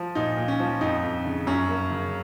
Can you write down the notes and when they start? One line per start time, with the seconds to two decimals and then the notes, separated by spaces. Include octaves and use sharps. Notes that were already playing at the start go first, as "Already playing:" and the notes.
Already playing: F3
0.15 A#2 D#4
0.37 A#2
0.48 C#4
0.60 F3
0.81 F2 D#4
1.03 F2
1.25 C#3
1.47 F#2 C#4
1.69 A#3
1.91 C#3